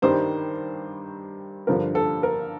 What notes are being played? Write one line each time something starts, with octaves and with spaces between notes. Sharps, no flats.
G2 D#3 G3 C5
G2 D3 F3 A#4
A4
A#4